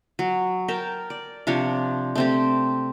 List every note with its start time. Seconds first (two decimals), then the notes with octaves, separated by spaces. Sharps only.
0.19 F#3
0.68 A#4 G5 A5
1.10 D5
1.47 C3 F3 D4 C#5
2.16 A3 C4 G4